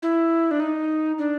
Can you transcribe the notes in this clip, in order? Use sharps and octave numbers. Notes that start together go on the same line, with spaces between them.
E4
D4
D#4
D4